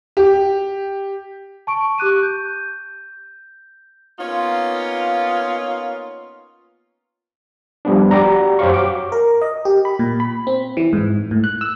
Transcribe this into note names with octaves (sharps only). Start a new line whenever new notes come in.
G4
A5 C#6 D7
G4 D6 F#6 D#7
G6
A#3 B3 C#4 D#4 F4
F3 G3 B3 D4
F#4 G4 D5 A#5
F#2 G4 C5 C#5 F5 C#6
F#4 D6
A#4
D#5
G4
B5
A#2
B5
C4
E3
G#2
A2
F#6
E6